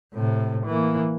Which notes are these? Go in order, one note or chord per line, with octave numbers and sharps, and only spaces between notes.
A2 C3
E3 A#3